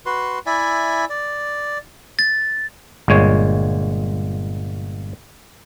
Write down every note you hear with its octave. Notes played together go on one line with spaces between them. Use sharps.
F#4 B4 C6
E4 D5 E5 G#5
D5
A6
G1 A#2 G#3 C#5